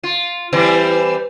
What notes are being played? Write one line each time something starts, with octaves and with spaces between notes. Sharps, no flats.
F4
E3 G3 C4